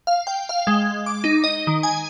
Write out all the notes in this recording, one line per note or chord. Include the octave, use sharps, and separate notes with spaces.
F5
G5
F5
G#3
D6
D#4
D#5
D#3
G#5